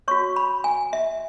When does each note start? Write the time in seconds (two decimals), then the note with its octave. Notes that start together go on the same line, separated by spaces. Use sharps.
0.08 F#4 C#5 C#6
0.36 B5
0.64 G#5
0.93 E5